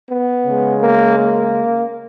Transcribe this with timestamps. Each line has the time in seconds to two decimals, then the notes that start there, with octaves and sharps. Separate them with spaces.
0.08 B3
0.44 C#3 G#3
0.81 A#3
1.17 A#3